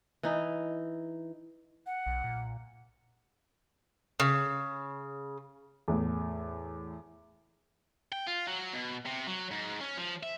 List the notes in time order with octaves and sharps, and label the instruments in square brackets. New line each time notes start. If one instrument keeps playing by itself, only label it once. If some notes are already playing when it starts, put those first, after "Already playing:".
[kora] E3 D#4
[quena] F#5
[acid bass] B1
A#2
[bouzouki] C#3
[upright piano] E2 A2
[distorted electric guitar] G5
F4
F#3
B2
C3
F#3
G#2
C#4
F3
E5